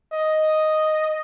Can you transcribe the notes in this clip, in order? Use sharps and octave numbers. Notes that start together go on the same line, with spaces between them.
D#5